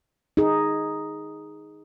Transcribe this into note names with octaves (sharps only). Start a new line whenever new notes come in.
D#4 G#4